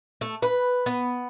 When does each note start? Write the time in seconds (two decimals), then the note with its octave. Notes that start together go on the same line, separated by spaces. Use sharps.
0.21 A3
0.42 B4
0.86 B3